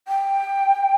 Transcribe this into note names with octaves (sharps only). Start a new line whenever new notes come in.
G5